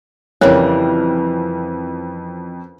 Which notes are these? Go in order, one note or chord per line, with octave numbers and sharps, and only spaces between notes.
F2 C#3 E3 G3 A#4 C#5 F#6